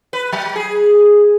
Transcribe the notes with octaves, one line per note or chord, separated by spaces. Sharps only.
B4
F#3
G#4